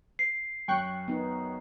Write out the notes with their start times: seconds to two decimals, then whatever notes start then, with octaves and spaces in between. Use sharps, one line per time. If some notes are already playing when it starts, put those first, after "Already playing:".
0.19 C7
0.68 F#2 G5 C#6 F#6
1.08 B3 D#4